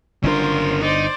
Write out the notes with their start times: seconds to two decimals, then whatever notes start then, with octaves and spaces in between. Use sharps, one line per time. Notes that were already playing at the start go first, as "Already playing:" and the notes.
0.23 G1 G2 C#3 D4 F4 A#4 C5
0.82 D#4 C5 D5